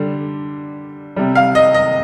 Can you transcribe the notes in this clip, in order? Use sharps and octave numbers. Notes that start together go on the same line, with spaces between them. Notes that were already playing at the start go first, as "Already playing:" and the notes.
Already playing: D3 G3
C3 G3
F5
D#5
D#5